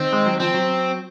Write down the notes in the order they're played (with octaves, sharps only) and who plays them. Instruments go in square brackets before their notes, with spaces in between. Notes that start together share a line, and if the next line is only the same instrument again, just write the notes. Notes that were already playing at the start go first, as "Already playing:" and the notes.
Already playing: [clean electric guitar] D#3 [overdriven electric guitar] C4
[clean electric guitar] G#3
F#3
[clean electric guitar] F3 [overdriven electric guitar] C4
[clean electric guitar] F#3